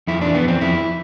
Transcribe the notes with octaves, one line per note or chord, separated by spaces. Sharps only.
F2 E4
E3 D4
B3
F2 C4
F2 E4